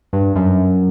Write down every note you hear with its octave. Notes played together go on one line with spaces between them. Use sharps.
G2
F#2